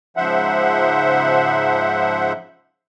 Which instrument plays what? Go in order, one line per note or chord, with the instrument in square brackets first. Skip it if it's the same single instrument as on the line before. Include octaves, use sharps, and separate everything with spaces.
[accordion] G#2 C#3 F3 C5 E5 F#5